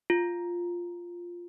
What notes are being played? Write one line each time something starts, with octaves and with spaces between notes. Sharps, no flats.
F4